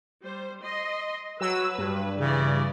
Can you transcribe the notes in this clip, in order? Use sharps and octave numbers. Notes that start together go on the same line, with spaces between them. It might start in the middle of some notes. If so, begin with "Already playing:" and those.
G3 C5
D#5 C6
F#3 B4 E6
G2
C#3 E3 D5